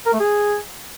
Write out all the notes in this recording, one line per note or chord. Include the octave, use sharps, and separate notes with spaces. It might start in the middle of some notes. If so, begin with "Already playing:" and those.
A#4
A3
G#4